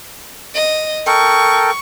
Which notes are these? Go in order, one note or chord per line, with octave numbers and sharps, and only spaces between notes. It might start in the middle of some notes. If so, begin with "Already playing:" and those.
D#5
A4 A#4 G5 C#6